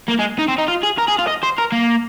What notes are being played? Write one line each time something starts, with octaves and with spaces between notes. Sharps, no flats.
A#3
G#3
D#4
C4
D#4
F4
G#4
A#4
G#4
F4
D#5
C5
A#4
A#3